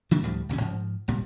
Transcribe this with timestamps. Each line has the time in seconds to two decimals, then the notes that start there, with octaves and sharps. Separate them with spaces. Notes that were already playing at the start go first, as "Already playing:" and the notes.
0.11 D#3 F#3 A#3 D4
0.23 D2 A2 F3 G3
0.49 A#1 D#2 C3 C#4
0.61 G#2 F3
1.08 G#1 A#2 G3